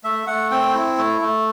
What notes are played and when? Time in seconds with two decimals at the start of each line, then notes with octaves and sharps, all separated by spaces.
0.04 A3 E5
0.27 A3 F#5
0.51 C4 G5
0.74 E4
0.98 A3
1.22 A3